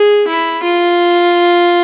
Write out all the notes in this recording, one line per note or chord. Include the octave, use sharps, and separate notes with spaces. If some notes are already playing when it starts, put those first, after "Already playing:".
Already playing: G#4
E4
F4